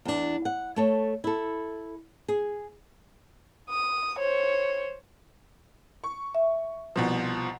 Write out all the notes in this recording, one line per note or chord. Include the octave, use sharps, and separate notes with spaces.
E2 D4
F#5
A3 A4 C#5
E4 A4
G#4
D#6
C5 C#5
C#6
E5
C2 B2 F3